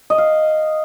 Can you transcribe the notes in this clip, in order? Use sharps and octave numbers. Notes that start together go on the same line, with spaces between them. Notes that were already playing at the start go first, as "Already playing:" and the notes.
D#5
F5